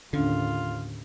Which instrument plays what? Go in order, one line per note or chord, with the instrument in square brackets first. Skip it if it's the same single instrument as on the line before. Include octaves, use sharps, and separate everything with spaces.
[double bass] D#2 A2 [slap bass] D3 [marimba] C#4 D4 [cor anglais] F4